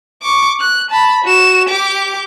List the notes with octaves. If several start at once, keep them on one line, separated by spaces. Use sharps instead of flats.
C#6 D6
F#6
A5 B5
F#4 E7
G4 D6